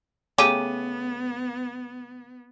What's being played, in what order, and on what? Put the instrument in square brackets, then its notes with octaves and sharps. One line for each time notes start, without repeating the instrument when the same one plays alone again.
[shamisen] C#3 A3 G4 [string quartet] B3 [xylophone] D6 D#7